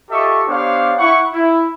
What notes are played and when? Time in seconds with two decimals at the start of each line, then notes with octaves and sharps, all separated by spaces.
0.10 F4 G4 A4 D#5 E5 C#6
0.48 B3 D4 G4 C5 C#5 F5
0.98 E4 F#5 C#6
1.33 E4